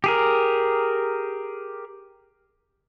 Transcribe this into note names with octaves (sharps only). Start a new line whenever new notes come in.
G4 G#4 A#4